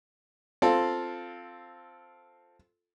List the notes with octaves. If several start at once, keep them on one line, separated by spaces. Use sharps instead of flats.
C4 F4 A4